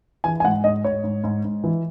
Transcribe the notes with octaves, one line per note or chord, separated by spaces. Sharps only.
E3 G#5
G#5
G#2 F#5
G#2 D#5
G#2 C#5
G#2
G#2
G#2
E3